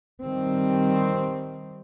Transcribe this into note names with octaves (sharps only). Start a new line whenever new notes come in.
D#3 G3 C4